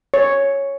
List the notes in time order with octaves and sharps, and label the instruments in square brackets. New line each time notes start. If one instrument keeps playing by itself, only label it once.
[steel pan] C#5